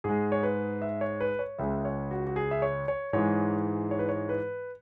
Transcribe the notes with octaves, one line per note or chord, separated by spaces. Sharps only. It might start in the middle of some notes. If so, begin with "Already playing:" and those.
G#2 G#3 G#4
C#5
B4
E5
C#5
B4
C#5
C#2 C#3 G#3 E5
C#5
F#4
F#4
G#4
E5
C#5
C#5
G#2 E3 G#3 C#5
C#5
B4
C#5
B4